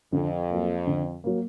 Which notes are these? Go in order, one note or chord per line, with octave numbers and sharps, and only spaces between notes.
F2 D3
F#3 A#3
D3
F#3 A#3